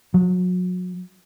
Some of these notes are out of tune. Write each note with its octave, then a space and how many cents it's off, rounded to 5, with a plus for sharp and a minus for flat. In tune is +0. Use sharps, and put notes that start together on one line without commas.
F#3 -30